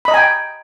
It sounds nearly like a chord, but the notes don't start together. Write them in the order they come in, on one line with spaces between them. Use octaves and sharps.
B5 D#5 A#5 G#5 G5